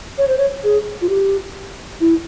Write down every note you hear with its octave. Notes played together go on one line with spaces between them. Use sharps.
C#5
C5
C#5
G#4
F4
G4
E4